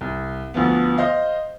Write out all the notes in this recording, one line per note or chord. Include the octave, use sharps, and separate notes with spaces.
C2
D2 F3 B3
C5 D#5 F5